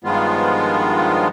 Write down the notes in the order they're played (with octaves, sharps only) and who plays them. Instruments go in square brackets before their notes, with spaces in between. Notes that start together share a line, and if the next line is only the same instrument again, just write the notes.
[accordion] G2 D#3 F3 G#3 B3 F4